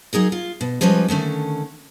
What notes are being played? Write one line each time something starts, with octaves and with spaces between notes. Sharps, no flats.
F#3 D#4 G#4 A#4
F4
B2
F3 G3 G#3 C#4 B4 D#5
D3 D#3 A3 C#4